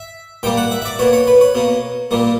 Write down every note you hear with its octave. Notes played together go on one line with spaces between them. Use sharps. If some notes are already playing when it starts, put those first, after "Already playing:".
Already playing: E5
A#2 G3 A#3 G5
F#5
E5
E5
D5
B2 A#3 C#5
C#5
B4
C#5
B2 A#3
A#2 G3 A#3